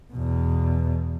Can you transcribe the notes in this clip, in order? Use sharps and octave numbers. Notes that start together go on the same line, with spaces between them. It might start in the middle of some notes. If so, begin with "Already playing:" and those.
E2 B2